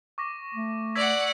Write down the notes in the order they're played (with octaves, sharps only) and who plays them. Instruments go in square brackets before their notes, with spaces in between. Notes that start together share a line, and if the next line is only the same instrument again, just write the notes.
[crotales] C#6 D6 A#6
[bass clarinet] A3
[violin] D5 F#5 [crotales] E6 G#6 B6